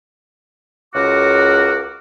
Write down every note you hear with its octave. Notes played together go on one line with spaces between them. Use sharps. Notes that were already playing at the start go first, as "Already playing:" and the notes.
C#2 C#3 F#4 A#4 D6